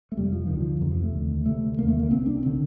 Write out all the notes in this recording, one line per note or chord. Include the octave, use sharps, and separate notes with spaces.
A3
F2 C3 G3
F3
D2 D3 D#3
F3
F2 C3 D#3
F3
A3
D#2 D3
D2 C3 A3
D#2 D3 A#3
A3
A#3
C2 C3 C4
D4
D3 C4